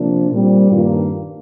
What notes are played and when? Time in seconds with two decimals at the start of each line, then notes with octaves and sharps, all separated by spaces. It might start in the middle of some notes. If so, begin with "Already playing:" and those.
Already playing: C3 F3 A#3 D4
0.31 A#2 G3 C4
0.72 G2 D#3 A#3 D4 F4